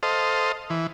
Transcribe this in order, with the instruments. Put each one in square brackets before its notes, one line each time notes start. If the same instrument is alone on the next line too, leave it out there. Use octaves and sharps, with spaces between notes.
[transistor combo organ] A4 C5 D#5 F5
E3